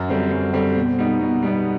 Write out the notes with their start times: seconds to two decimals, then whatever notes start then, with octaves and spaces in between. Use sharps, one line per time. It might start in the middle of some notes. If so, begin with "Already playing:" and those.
Already playing: F#2
0.08 D3 G3 C4
0.31 F#2
0.53 D3 G3 C4
0.76 B2
0.99 G3 B3 D#4
1.21 B2
1.43 G3 B3 D#4